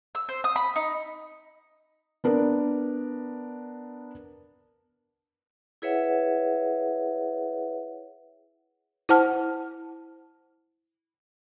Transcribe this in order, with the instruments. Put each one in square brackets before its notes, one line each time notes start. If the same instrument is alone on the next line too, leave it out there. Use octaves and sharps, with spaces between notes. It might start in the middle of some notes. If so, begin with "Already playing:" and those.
[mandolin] E6
C5
D#6
B5
D#4
[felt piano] B3 D4 A#4
[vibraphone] E4 G#4 B4 C#5 E5 F#5
[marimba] E4 C5 F#5 A5 F6